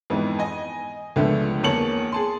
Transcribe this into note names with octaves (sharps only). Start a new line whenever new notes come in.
F2 G#2 E3 B3
D#5 G#5
C#2 D3 F3 A3 B3 D4
E2 A#3 C#5 A5 C#7 F#7
G#4 A5 C6